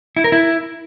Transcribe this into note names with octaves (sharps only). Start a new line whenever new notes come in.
E4
A#4
E4